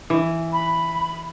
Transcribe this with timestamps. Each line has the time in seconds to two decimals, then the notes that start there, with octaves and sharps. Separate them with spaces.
0.10 E3
0.53 B5